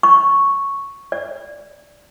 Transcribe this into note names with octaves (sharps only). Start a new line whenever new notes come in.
C#6
D5